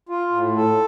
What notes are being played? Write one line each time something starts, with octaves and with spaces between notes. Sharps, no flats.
F4
A2
A4